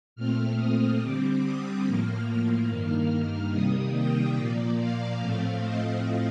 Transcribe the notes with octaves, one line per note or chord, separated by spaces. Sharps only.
A#2 A3 C4 F6
D#6
D3 G3 C4 D6
D#6
A2 F3 A#3 F6
G2 D#3 A#3
C3 D#3 G3 A#3 D#6
G5
A#2 F3 A#3 D5
F5
A2 F3 A3 C4 F5
D#5